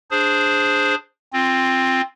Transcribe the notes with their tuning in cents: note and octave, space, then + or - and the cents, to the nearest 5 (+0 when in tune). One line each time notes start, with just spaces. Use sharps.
D4 +0 G#4 +0 C5 +0
C4 +10 F4 +0